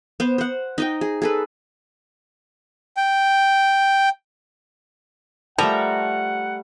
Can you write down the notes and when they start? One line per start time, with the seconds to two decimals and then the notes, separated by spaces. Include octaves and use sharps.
0.20 B3 C5
0.38 C5 F#5
0.78 D#4 D#5 G5
1.01 G#4
1.22 G#4 A4 B4
2.97 G5
5.58 F3 G3 A3 A#4 F#5 A#5